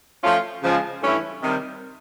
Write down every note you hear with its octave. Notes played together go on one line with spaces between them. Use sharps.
F3 A3 C#4 F4
C#3 F3 G#3
G2 E3 A3 C#4 E4
C3 D#3 G3